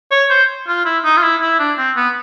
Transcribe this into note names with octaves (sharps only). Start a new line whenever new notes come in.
C#5
C5
F4
E4
D#4
F4
E4
E4
D4
C4
B3